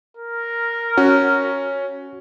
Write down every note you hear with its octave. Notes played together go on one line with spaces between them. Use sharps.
A#4
C#4 F#4